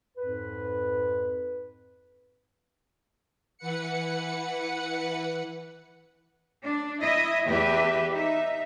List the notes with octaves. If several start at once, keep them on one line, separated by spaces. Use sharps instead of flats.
F2 G#2 B4
E3 B4 F#5 C#7
D4
E4 D#5 E5
E2 G4 B4 E5
D#4 E5